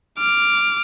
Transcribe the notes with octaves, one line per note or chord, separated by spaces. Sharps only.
D6 F6